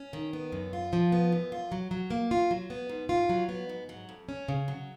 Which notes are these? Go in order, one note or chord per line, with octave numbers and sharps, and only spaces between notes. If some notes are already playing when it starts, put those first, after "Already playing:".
Already playing: C#4
D#3
B3
F#2
F4
F3
B3
F#2
F4
F#3
F#3
A#3
F4
F#3
B3
G#2
F4
F#3
B3
G#2
F#3
F2
C#4
C#3
F#3